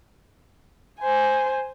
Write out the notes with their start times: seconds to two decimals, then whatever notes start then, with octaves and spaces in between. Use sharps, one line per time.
1.00 C5 G#5